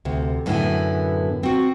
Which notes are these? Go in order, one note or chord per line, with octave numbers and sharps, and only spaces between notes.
D2 C3
F#2 A2 D3 B3 E4 G#5
C4 F#4